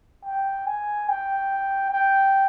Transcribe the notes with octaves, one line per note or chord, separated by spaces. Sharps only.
G5
G#5
G5
G5